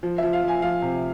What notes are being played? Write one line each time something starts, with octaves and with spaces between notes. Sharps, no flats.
F3
F3 E5
F5
F3 G#5
F3 F5
C3